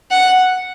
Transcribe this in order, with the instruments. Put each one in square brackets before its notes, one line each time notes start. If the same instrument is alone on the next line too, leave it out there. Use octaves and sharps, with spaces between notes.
[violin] F#5